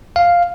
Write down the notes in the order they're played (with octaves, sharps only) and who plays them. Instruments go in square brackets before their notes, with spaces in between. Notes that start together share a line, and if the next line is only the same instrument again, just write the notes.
[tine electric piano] F5